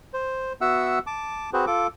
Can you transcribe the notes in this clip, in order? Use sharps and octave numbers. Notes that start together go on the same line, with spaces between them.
C5
B3 F#4 E5 F#5 E6
A5 D6
C4 F#4 G#4 B4 C5
F4 A4 D6